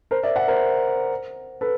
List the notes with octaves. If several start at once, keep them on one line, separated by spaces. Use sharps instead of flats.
A#4 C5
D5 E5
E5 F#5
A#4 C5
A4 B4